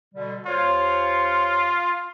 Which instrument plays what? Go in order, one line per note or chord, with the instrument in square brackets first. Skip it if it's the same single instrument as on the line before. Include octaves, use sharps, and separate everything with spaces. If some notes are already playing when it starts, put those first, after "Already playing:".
[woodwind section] B2 D3 G3
[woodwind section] D#2 C5 C#5 [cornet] F4